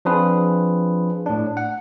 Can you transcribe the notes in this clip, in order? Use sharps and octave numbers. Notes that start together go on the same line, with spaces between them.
F3 C4 D4 F4 G#4 B4
A2 D4
F#5